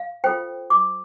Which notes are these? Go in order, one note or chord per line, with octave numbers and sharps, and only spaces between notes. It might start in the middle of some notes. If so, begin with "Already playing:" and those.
Already playing: F5
F4 A4 C5 G5
D6